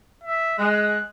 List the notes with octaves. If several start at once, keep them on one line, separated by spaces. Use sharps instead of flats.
E5
G#3 F#6